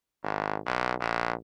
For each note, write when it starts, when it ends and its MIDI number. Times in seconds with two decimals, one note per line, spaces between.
0.23 0.58 32
0.66 0.94 35
1.00 1.34 34